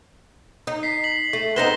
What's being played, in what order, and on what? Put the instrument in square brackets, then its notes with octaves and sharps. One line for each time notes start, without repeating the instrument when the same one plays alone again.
[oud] D#4
[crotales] B6 C7
B6 F#7
[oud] A3
[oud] B3 C4 D#4 [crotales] A#6 E7 G7